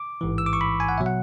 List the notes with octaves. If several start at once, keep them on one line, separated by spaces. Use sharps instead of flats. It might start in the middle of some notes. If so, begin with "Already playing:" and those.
Already playing: D6
A1 G#2 E3
E6
D6
C#6
B5
G#5
F#5
B2 F#3 E5
F#5